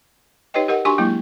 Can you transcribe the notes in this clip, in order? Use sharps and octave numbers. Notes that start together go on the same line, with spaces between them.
D#4 G4 B4 C#5 D#5 G5
G4 A#4 D#5 F#5
D4 F#4 G4 G#5 C6 C#6
F#3 G#3 A#3 E4